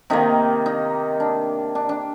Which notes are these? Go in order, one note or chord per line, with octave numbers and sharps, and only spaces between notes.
C3 D#3 A#3 D#4
D#4
D4
D4
D4